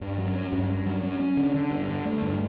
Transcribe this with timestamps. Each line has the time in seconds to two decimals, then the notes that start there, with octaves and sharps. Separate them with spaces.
0.01 G2
0.18 F#3
0.35 C#4
0.52 G2
0.69 G2
0.86 F#3
1.03 C#4
1.20 C#4
1.37 D3
1.54 D3
1.71 G2
1.88 D3
2.05 A3
2.22 G2